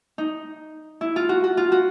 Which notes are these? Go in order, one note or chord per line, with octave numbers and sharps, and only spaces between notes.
D#4
E4
F4
F#4
F#4
F4
F#4